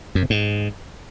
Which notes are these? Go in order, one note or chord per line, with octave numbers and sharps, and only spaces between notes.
F#2
C3
G#2